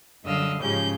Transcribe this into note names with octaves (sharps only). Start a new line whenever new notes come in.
F#2 D3 G3 D#5 F5 E6
G#2 C#3 F3 C#4 G4 G6